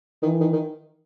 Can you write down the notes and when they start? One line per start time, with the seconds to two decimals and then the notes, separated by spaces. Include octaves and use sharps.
0.22 D#3 E3
0.40 D#3
0.53 D#3